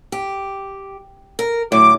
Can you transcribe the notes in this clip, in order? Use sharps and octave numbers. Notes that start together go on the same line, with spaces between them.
G4
A#4
A2 D3 F#3 D6